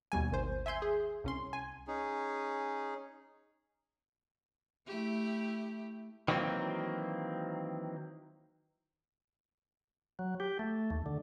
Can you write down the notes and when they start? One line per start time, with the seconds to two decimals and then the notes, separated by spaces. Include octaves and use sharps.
0.12 D#2 B2 G3 G#5
0.31 G#1 D#3 C5
0.66 E5 G#5 C6 G6
0.82 G#4
1.24 C2 C#4 C6
1.53 G#5
1.87 C#4 D#4 G#4
4.87 A3 E4 G4
6.28 D#3 E3 F#3 A#3 C4
10.19 F#3
10.40 G4
10.59 A3
10.90 D#2
11.06 D3